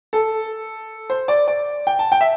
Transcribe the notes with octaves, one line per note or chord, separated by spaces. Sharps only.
A4
C5
D5
D5
G5
A5
G5
E5